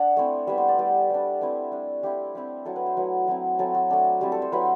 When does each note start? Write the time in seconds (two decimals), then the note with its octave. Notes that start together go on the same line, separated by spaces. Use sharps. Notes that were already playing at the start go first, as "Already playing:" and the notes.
Already playing: D4 F#5
0.17 A3 C4 E4
0.47 G3 B3 E4 E5
0.58 C5
0.68 D5
0.78 G3 B3 E4 G4
1.10 G3 D4
1.41 A3 C4 E4
1.72 G3 D4
2.03 G3 C4 E4 G4
2.35 G3 C4 E4
2.65 F#3 C4 E4 A4
2.76 B4
2.86 C5
2.97 F#3 A3 E4 B4
3.27 F#3 C4 E4
3.59 F#3 C4 E4 A4
3.74 F#4
3.90 A3 D4
4.21 G3 C4 E4 G4
4.32 A4
4.42 C5
4.52 F#3 C4 E4 B4